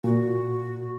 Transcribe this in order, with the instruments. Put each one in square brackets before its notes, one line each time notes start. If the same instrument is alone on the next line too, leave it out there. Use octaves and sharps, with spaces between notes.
[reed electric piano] A#2 [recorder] F#4